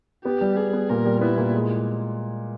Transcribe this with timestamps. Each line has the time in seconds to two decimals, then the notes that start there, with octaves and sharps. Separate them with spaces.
0.25 B3 G4
0.41 G3
0.57 B3 G#4
0.73 B3
0.90 A#2 A#4
1.06 G3
1.21 B3 E4
1.38 A#2
1.54 G#3